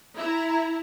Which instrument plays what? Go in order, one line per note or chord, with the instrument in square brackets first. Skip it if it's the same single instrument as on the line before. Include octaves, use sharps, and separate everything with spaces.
[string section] E4 E5 A#5